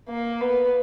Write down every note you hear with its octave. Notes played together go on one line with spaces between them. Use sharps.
A#3
B3